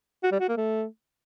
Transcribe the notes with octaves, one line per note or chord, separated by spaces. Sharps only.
F#4
G3
F#4
A#3
A3